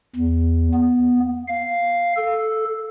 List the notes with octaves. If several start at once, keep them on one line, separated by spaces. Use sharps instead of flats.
E2
B3
F5
A4